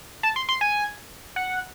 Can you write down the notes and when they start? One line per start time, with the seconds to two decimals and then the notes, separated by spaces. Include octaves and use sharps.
0.23 A5
0.36 C6
0.49 C6
0.61 G#5
1.36 F#5